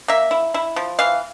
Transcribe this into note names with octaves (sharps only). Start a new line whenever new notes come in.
A#3 E5
E4
E4
F3
E3 F5